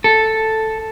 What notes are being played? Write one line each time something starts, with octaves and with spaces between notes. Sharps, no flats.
A4